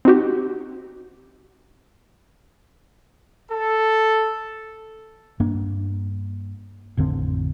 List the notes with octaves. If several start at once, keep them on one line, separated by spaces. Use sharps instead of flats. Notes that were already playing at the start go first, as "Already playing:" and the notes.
C4 D#4 F#4 G4
A4
G2 A#3 D4
A1 F2 D3 C4